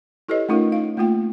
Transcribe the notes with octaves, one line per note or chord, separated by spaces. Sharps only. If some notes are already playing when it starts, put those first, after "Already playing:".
E4 G4 A4 B4 C#5 D#5
A3 C#4 D#4 F4 A#4 F5
F5
A3 A#3 F4 G5